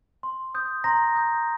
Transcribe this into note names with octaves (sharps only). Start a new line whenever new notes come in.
C6
D#6 G6
A#5 C6 A#6
D#6 G6